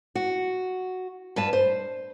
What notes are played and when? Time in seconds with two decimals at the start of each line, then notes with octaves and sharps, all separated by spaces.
0.15 F#4
1.36 G2 B4 A5
1.53 C5